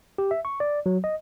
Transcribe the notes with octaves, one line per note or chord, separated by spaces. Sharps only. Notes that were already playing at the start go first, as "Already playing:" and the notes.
G4
E5
C#6
D5
F#3
D#5